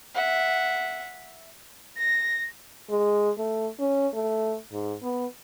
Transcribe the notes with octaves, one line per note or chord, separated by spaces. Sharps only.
E5 F#5
A#6
G#3
A3
C#4
A3
G#2
B3